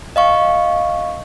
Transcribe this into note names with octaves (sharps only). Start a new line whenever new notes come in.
D#5 F5 C#6